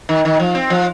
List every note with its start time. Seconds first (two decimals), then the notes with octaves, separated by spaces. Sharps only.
0.09 D#3
0.25 D#3
0.40 F3
0.55 C4
0.70 F3